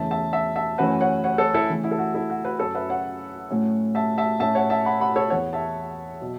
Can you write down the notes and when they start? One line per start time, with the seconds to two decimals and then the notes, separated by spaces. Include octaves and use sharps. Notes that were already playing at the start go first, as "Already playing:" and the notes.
Already playing: E2 C#3 E3 A3 C#4 E5 A5
0.11 E5 A5
0.33 E5 A5
0.56 E5 A5
0.78 F#2 E3 A3 C#4 F#4 B4
1.01 C#5 F#5
1.24 C#5 F#5
1.38 A4 C#5
1.54 E4 A4
1.69 C#3 E3 A3 C#4
1.84 E4
1.91 A4
1.99 F#4
2.15 E4 A4
2.30 F#4
2.45 F#4 B4
2.59 F#2 F#3 C#4 A4 C#5
2.75 B4 E5
2.89 C#5 F#5
3.51 A2 F#3 A3 C#4
3.95 E5 A5
4.18 E5 A5
4.40 A2 A3 C#4 E5 A5
4.55 C#5 F#5
4.70 E5 A5
4.85 F#5 B5
5.00 F#5 B5
5.16 A4 C#5
5.30 E2 E3 B3 C#5 F#5
5.53 E5 A5
6.21 B2 F#3